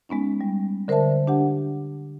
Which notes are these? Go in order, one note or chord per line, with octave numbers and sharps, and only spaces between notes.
G#3 B3 C#4 D#4
G3
D3 A#4 C5 D5 E5 A5
D4 G4 F#5